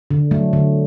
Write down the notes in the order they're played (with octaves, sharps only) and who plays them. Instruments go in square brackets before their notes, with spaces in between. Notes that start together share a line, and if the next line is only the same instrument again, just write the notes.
[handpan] D3
F#3 A3
D3